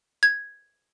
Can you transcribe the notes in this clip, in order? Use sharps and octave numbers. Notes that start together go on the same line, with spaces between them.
G#6